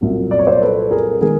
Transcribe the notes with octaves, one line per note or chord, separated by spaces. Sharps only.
C2 A#2 F#3
D5
C#5
C5 D5
A4 B4
G#4 A#4
D#3 G#3 G#4 A#4